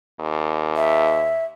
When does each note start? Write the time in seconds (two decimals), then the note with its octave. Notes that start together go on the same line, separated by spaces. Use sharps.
0.20 D#2
0.76 E5